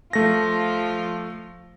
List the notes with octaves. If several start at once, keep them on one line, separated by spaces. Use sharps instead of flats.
F3 A3 F4 A#6